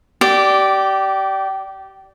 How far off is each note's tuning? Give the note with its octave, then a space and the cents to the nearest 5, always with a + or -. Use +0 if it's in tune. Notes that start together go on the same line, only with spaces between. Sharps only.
G4 -25 D5 +0